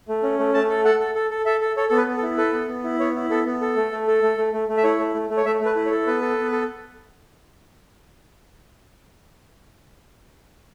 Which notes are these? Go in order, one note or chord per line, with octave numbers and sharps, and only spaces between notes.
A3
C#4
A3
A3 A5
A4
A4 F#5
A4
A4
A4
A4 E5
A4
A4 C#5
B3 A4
B4
B3
A4
E4
A4 B4
B3
B3
E4
B3 C#5
E4
B3 A4
B3
A4
A3
A3
A4
A3
A3
A3
A3
E5
E4 C#5
A3
A3
A3
C#5
A3 E5
A3
B4
E4
C#5
A4
B3 B4
A4
B3
A4